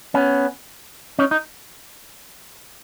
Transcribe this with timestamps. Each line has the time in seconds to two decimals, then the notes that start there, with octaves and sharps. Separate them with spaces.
0.14 B3 C#4
1.19 C#4 D#4
1.31 D#4